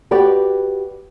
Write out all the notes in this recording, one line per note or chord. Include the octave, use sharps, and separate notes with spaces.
F#4 G4 B4 D5